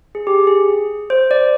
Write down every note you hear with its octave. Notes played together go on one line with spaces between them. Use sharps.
G#4
G4
G#4
C5
D5